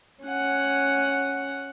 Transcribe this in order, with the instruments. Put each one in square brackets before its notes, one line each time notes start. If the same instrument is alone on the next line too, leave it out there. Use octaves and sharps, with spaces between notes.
[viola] C#4 F#5